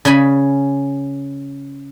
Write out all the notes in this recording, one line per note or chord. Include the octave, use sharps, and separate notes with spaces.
C#3 C#4 G#4 G#5 B5